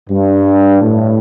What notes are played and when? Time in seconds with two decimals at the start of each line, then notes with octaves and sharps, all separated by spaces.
0.10 G2
0.82 A2